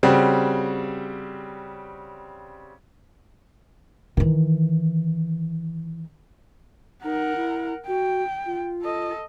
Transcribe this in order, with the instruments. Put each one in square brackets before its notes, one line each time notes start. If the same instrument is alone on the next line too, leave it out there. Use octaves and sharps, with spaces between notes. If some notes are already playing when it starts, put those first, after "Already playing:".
[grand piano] C#3 G3 C4 F#4
[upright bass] D#3 E3
[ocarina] D#4 [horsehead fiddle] A#4 F#5
[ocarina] E4
[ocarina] F#4 [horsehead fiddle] G5
[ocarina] F4
[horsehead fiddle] A4 D#5